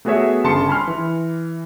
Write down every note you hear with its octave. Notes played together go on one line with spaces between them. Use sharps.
A3 B3 F#4 G#4 C#5 E5
G1 C#3 A5 C6 C#7
G#5 B5 C6 F6
E3